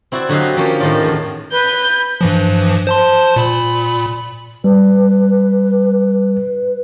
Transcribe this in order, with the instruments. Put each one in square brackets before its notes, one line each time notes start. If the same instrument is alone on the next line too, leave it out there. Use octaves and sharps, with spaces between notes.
[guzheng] C4 E4 F#4 D5
D3 F#3 F#4 G4 D#5 F5
F3 A#3 C#4 G4 C#5
A2 D#3 C#4 F4 D5
E2 A2
[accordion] B4 [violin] G6
[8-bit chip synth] G2 E3 F3
C5 A5 C6
A#2 B5
[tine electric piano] G3 [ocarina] B4